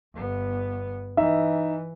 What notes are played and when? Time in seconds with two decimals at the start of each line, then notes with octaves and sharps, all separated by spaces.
0.14 G1 B3
1.17 E3 D#4 E5